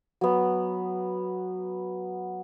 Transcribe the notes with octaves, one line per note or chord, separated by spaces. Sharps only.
F#3 B3